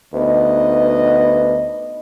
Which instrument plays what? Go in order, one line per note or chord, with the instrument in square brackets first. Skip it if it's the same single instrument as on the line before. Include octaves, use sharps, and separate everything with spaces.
[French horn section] D2 B3 D#4 B4 D#5